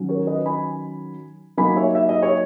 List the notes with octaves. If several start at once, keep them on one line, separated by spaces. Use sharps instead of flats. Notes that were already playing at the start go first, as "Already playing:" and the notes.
Already playing: D#3 F#3 C#4
A#4 C#5
B4 D#5
G#5 B5
F#3 A#3 D#4 G#5 B5
C#5 E5
E5
D#5
C#5